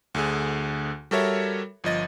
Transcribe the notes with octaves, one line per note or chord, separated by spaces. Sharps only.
D2 D3 G#4
G3 F#4 A4 A#4 C#5 E5
G1 F3 D#5 A6